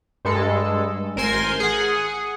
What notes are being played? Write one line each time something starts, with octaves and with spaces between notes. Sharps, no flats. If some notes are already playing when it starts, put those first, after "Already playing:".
G2 G#3 A4
A1 A#4 C5 G#5 C6
G#4 F#5